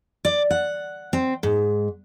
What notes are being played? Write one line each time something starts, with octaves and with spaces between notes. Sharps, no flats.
D5
F#5
C4
G#2